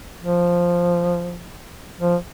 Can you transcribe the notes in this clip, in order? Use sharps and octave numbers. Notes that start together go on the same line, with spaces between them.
F3
F3